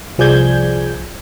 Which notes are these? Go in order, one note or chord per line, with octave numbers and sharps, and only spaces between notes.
C2 F3 G#4 D5 G6 G#6